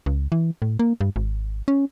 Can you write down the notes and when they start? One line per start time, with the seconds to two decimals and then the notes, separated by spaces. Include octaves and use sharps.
0.06 C#2
0.32 E3
0.62 A2
0.79 A#3
1.01 G2
1.16 G#1
1.68 C#4